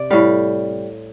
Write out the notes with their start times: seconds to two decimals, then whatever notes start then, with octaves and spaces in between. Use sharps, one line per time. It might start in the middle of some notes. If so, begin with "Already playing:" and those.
Already playing: C3 D5
0.10 A2 G3 F5